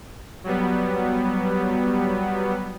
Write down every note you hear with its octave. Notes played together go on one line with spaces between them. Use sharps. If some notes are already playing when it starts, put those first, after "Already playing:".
F#3 G3 B3